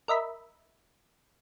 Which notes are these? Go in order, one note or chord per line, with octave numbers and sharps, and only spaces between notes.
A#4 D#5 E5 B5